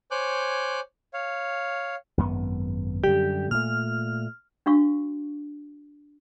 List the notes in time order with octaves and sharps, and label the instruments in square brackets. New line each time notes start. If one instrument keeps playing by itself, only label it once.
[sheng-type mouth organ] C5 C#5 G#5 D6 F#6 G6
C#5 F5
[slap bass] G#1 F#2 B3
[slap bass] F#2 D3 G3 [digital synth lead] G4
[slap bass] A#2 A3 [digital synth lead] F6
[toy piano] D4 F#4 F5 C#6